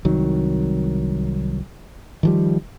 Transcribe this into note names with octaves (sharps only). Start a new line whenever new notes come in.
C2 D#3 F#3
D#3 F3 G3